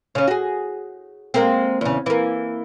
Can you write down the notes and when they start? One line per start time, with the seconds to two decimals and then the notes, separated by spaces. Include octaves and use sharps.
0.15 C#3 C#4
0.28 F#4 G#4
1.34 G#3 A#3 C4
1.81 E2 C#3
2.06 E3 A#3